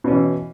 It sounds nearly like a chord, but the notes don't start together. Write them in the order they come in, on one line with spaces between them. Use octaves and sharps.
B2 C#4 E3